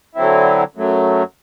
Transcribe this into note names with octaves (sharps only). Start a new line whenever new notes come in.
D3 F#3 C4 E4
F#2 F#3 A3